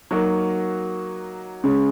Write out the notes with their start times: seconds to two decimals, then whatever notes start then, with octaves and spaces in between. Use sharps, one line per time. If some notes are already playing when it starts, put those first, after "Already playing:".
0.11 F#3 A#3 D#4 F#4 A#4
1.64 C#3 G#3 C#4